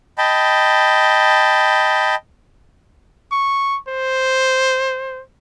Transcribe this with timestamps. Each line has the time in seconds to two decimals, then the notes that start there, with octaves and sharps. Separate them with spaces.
0.18 D#5 G5 A5 B5
3.32 C#6
3.88 C5